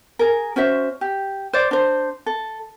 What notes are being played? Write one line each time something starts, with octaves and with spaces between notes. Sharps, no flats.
G#4 A#4
C#4 F#4 C5 E5
G4
C5 D5
D4 C5
A4